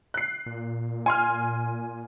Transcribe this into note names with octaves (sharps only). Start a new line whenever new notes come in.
F#6 C7
A#2
G#5 C6 F6